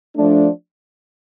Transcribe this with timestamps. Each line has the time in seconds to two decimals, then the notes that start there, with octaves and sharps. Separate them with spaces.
0.16 F3 A3 D4